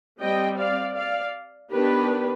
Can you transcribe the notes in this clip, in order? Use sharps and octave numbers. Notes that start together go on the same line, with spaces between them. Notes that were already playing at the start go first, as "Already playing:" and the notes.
G3 C4 D#5 G5
D5 F5
D5 F5
D#3 B3 D4 G4 B4